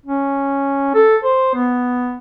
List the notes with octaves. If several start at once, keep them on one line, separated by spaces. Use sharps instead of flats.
C#4
A4
C5
B3